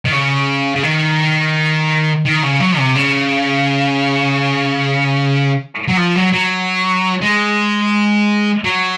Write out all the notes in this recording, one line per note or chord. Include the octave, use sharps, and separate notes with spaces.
D#3
C#3
C#3
D#3
D#3
C#3
F#3
C3
C#3
F#3
F3
F#3
F#3
G#3
F#3